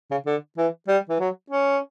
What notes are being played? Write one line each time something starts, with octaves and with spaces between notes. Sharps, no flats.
C#3
D3
E3
G3
E3
F#3
C#4